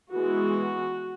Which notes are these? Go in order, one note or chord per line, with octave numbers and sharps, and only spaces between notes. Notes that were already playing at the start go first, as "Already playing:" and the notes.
E3 G#3 B3 F#4